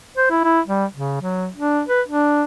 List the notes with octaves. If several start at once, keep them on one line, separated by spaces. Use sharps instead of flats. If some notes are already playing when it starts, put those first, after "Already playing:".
C5
E4
E4
G3
C#3
F#3
D4
B4
D4